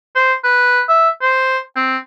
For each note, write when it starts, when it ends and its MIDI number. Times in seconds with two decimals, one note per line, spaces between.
0.15 0.33 72
0.44 0.82 71
0.89 1.09 76
1.22 1.58 72
1.76 1.97 60